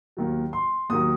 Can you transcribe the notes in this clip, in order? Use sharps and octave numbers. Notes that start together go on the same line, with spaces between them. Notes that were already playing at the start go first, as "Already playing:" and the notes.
D#2 D#3 F#3
C6
D#2 D#3 F#3 D#6